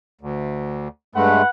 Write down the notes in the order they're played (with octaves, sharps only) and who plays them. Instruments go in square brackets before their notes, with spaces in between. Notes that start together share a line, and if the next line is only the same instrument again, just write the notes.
[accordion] D2
[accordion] G2 G#3 A3 [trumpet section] B4 F#5